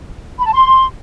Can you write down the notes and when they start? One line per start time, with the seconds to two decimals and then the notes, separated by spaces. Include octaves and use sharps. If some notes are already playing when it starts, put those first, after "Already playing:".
0.39 B5
0.46 A5
0.53 C6